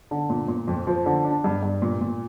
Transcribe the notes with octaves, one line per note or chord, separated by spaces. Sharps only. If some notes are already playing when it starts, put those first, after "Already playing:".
D3
A#2
A#2
F2
F3
D3
D4
G2
G2
A#2
A#2